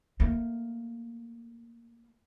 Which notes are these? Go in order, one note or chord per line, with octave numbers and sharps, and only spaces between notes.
A3 A#3